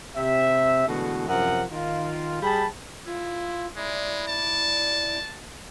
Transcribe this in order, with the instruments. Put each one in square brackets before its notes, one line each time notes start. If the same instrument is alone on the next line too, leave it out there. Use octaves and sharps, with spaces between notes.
[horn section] C3 E5
B2 D3 E3 G#3 A3 F#4
F#2 C3 F3 A#4 F#5
D#3 F4
G3 G#4 G5 A5 B5
[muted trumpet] E4 [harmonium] F4
[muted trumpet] G#3 [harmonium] E4 D5
[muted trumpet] A5